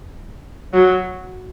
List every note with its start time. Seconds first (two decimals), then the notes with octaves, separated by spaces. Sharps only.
0.73 F#3